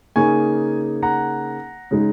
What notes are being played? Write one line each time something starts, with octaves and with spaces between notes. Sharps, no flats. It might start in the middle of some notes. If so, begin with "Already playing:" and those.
C#3 A#3 D#4 G#5 C#6
F#5 A#5
C#3 G#3 D#4